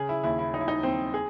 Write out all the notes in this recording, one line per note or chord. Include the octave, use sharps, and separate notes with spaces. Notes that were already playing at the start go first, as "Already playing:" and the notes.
Already playing: C#3 G#4
E4
D#2 E4
E4
F#3 D#4
E4
D#4
D#2 C4
G#4